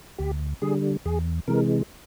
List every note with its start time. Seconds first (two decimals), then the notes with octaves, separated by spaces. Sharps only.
0.18 D2 G4
0.62 D3 G3 G#4
1.05 E2 G#4
1.48 C3 E3 G#3 A#4